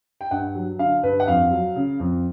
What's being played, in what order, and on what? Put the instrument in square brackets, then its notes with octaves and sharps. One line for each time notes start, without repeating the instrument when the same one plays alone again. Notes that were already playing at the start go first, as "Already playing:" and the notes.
[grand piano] G5
G2 F#5
F#3
D3 F5
G2 B4
F#5
F2 F5
F#3
C#3
F2